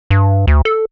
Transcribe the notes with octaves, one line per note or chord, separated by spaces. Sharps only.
G2
D2
A4